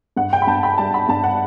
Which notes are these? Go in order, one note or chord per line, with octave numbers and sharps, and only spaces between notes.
G2 F#5
G5
B5
G2 A5
B5
G3 A5
B5
G2 A5
F#5